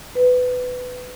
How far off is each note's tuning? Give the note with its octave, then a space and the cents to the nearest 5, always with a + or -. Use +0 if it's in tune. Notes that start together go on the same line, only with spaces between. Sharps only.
B4 +15